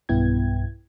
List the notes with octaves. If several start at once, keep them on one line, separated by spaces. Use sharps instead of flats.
B1 G2 B3 E4 G5 G#6